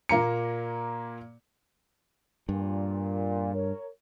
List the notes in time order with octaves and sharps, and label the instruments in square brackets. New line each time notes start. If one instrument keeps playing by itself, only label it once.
[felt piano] A#2 A#3 A#5 C#7
[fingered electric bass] G2 [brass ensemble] A#2
[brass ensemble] A#4 C#5